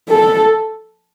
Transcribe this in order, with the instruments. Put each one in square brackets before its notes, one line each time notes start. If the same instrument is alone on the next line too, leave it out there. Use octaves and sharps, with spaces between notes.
[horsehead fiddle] A4